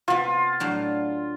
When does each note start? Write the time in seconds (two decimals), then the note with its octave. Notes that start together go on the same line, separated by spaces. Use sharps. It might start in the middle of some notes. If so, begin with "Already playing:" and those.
0.08 C3 B3 F4
0.60 A2 F#3 D4